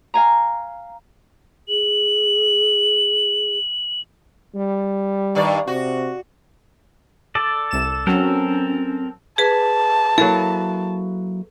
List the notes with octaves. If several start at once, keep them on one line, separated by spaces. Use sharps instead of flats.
F5 G#5 A#5
G#4 F#7
G3
G2 D#3 D5
C3 F#4
A4 D5
C2 E7
F#3 C4 C#4 A4 A#4
G#4 B4 A5
F#3 A#3 E4 A4